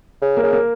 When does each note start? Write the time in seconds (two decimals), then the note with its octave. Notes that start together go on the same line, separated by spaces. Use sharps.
0.22 C#3
0.37 A#3
0.42 C#3
0.53 A#3